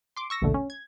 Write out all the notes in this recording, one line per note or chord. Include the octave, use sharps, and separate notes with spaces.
C6 D6
C#6 E6 A#6
A#1 D#2 B2 D3 A3
C#4
G#6